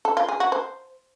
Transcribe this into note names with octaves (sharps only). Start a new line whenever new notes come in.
A4
F4
G#4
F#4
C5